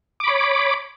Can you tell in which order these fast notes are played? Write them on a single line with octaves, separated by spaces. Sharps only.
D6 B5 C#5